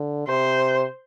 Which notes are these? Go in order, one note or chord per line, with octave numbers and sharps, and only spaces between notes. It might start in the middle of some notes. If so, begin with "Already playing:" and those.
Already playing: D3
C3 C5